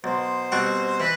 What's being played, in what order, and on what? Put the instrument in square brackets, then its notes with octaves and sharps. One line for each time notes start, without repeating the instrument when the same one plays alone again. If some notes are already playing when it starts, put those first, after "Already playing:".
[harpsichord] B1 [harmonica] C5
[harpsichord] B2 G3 C4 F#4
[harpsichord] E3 [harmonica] B4